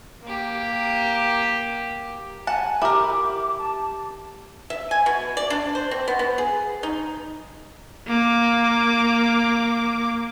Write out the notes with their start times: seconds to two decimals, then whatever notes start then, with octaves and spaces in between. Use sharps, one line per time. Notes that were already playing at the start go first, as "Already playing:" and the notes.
0.23 A#3 G4
2.47 F#5 G#5 A5
2.82 E4 G4 A#4 D6
3.59 A5
4.70 E5
4.91 G#5
5.06 B2
5.37 D5
5.50 D4
5.75 C5
5.91 C4
6.08 B3
6.19 B3
6.38 G#4
6.83 D#4
8.07 A#3 D6